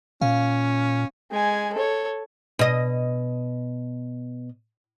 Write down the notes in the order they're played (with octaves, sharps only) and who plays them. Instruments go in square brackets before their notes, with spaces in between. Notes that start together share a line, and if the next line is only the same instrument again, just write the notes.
[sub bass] A#2 [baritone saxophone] C#4 [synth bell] F5
[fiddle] G#3 G#5
A4 C#5
[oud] B2 D#5